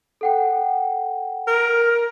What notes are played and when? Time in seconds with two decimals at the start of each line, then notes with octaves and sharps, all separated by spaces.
0.21 A4 F#5 G5
1.47 A#4